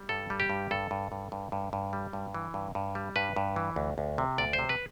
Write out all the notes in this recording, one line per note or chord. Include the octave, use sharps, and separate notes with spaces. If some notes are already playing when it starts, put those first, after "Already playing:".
Already playing: G3
G2 A4
G3
G4
G2
G2 A4
G2
G2
G2
G2
G2
G3
G2
E3
G2
G2
G3
G2 B4
G2
E3
D2
D2
C3
D2 D5
C5
C3
B4